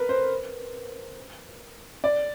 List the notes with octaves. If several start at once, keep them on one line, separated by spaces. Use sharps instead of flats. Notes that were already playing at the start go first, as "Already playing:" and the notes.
Already playing: A#4 B4
C5
D5